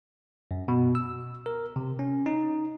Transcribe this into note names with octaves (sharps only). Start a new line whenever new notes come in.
F#2
B2
E6
A#4
C3
C#4
D#4